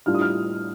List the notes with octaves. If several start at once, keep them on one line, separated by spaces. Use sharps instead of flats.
A2 G3 D4 F4 F6
D#6
F6